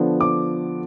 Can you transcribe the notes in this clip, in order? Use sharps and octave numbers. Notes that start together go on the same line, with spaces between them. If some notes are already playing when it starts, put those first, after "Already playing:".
Already playing: D3 F3 B3 D4
D6